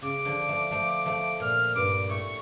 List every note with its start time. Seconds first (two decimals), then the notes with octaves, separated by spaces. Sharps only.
0.02 C#3 D6
0.25 D3 F3
0.48 F3 A3
0.71 F3 A3
1.06 F3 A3
1.40 A#2 F6
1.75 G2 D6
2.09 A2 C#6